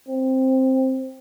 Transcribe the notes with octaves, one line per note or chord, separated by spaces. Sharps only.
C4